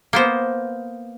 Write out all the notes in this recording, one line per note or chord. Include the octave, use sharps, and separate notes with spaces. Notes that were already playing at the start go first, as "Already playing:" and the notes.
A#3 B3 C5